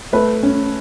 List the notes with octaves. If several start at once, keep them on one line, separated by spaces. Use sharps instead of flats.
A3 B4
C#4